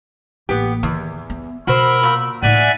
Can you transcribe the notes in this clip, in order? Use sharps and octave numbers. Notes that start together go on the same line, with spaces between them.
A1 A#3 B3 G4
E2 D#3
B3
B2 F#4 A#4 C5 B5 E6
A#2
A2 D#4 D5 E5 F#5 G#5